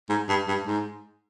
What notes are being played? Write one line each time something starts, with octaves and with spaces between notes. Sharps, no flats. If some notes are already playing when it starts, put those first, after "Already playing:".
G#2
G2
G2
G#2